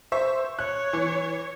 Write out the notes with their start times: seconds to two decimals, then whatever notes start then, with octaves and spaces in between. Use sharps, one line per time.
0.12 C5 E5 C#6
0.59 C#5 F#6
0.93 E3